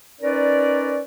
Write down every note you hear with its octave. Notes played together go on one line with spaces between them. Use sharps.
C#4 D#4 A#4 B4 D5